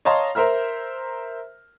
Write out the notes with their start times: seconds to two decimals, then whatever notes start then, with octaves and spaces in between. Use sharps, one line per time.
0.05 C#5 D#5 F5 A5 A#5 C6
0.35 A#4 C5 E5 A#5 F6